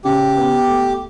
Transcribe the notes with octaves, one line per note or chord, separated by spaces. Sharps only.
C#3 G4
B3
A3